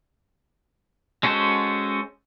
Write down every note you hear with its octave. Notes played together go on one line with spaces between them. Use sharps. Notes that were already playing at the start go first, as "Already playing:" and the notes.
G#3 C#4 F#4 A4 C5